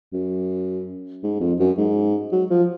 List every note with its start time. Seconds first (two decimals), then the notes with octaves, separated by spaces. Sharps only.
0.13 F#2
1.23 G#2
1.40 F2
1.59 F#2
1.78 G#2
2.32 F#3
2.50 F3